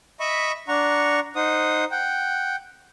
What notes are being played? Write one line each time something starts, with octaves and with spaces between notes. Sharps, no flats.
D#5 E5 B5 C#6
D4 F#5 A#5 C#6
D#4 C5 F#5 D#6
F#5 G5